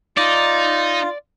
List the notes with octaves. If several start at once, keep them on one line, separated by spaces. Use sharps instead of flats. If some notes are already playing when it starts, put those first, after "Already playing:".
D#4 F4 D5